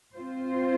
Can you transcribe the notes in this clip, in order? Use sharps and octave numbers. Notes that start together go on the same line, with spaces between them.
C4 F4 C5